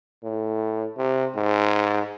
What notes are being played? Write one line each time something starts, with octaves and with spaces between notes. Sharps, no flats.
A2
C3
G#2